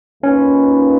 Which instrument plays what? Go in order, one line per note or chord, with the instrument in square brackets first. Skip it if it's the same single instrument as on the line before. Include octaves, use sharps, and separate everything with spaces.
[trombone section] D#2 D#3 A#3 F4 B4 [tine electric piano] C#4